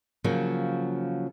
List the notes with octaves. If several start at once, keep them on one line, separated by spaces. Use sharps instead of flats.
C#3 F3 F#3 A#3